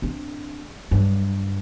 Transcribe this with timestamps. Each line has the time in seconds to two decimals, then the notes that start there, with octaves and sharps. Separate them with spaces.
0.02 C4 D4
0.91 G2 F#3